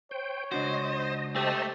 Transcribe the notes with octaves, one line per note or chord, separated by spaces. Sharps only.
C5 C#5 G5
C#2 D4 F#4 C5 D#5
A3 G4 C5 D#5 A5